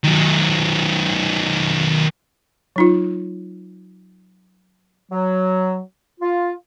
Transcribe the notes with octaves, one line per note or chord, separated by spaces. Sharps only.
D#3 F#3
F#3 D#4 F4
F#3
F4